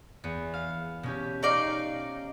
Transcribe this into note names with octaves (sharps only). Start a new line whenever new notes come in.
E2 B3
F5
B2 C#4 G4
C#4 D#4 D5 F5